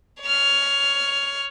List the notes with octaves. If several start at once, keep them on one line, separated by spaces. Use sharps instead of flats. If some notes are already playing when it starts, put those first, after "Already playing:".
C#5 F6